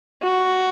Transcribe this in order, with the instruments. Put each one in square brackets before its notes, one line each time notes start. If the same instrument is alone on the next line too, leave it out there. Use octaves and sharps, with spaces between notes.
[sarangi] F#4